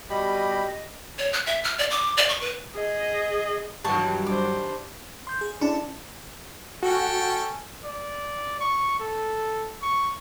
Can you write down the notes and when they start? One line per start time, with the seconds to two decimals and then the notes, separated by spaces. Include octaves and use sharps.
0.10 B2 G3 G4 D#5 B5
1.18 C#5
1.33 F#6
1.46 E5
1.64 F6
1.78 D5
1.90 D6
2.17 D5
2.29 C#6
2.41 B4
2.75 G#4 D#5
3.84 G2 D#3 E3 F#3 G3 A5 C#6
4.27 D4 C5 D6
5.27 C6 G6
5.41 G#4
5.61 C#4 D4 E4 A5
6.83 C#4 F#4 A4 G5
7.84 D5
8.60 C#6
9.00 A4
9.82 C#6